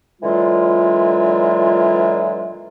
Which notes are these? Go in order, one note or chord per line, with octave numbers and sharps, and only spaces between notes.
A#2 D3 E3 F#3 G#3 F4